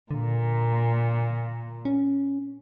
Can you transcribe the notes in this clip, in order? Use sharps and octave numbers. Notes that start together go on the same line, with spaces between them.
A#2 D3
C#4